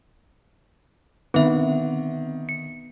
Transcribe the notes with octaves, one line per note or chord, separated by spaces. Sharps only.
D3 D#3 B3 C4 B4 E5
C#7